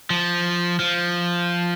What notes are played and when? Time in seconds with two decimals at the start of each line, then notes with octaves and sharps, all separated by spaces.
0.10 F3
0.80 F3